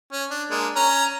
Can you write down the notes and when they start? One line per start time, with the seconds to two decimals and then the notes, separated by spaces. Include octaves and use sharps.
0.12 C#4
0.30 D4
0.50 G#3 A#3 D4
0.76 C#4 A#5